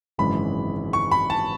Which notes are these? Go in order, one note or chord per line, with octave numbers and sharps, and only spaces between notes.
G#1 F#2 C#3 E3 G#3 B5
C#6
B5
A5